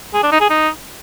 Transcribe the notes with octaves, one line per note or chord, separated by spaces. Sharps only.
G#4
D4
D#4
G#4
D#4